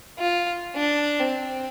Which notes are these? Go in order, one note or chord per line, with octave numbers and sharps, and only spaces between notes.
F4
D4
C4